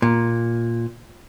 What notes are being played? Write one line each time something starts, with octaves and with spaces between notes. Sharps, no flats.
A#2